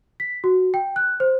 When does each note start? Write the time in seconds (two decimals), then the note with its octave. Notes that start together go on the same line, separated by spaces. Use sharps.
0.20 B6
0.44 F#4
0.74 G5
0.96 F#6
1.20 C5